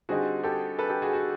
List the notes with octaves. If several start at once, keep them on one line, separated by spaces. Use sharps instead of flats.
D3 G3 C4 D#4 F#4 G#4
G4 A4
A4 B4
G4 A4
F#4 G#4
F#4